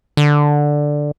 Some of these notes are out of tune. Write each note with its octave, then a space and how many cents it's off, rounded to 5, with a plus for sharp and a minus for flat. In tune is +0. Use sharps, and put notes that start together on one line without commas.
D3 +5